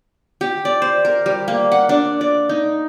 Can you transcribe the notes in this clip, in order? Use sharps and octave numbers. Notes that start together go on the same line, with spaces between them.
G4
D5
C5
A#4
G3
A#3
F#5
D4
D5
D#4